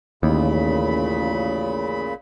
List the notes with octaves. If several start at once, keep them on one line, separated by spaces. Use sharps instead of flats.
A1 D#2 A#2 C#3 B5